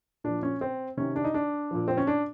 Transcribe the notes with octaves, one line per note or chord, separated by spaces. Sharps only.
A#2 F3 D4
C#4
C4
C3 D#3 C#4
D4
D#4
D4
A#2 F3
C4
C#4
D4